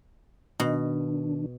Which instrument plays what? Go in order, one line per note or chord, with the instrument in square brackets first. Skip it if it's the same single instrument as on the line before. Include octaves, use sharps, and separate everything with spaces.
[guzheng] B2 [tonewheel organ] D#3 D4